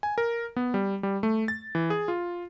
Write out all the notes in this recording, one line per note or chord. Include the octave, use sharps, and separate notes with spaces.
G#5
A#4
B3
G3
G3
A3
A6
E3
G#4
F4